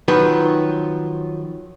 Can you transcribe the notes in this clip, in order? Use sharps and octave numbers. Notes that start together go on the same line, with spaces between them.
D#3 F3 F#3 B4